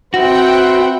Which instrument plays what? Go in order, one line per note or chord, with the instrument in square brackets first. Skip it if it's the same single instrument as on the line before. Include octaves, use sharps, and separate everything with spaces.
[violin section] C4 F#5 G5 [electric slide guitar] F#4 [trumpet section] B4 C5 E5